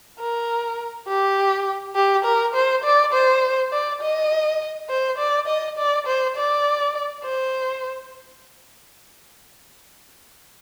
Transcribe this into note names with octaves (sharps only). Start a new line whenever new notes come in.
A#4
G4
G4
A#4
C5
D5
C5
D5
D#5
C5
D5
D#5
D5
C5
D5
C5